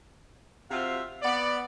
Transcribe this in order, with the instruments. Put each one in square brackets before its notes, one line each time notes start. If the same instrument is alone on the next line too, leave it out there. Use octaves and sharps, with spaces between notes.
[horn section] C3 C4 F4 F#4 E5 F5
B3 D5